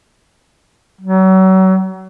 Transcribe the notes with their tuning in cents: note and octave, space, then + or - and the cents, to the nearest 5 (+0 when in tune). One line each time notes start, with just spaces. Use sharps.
F#3 +35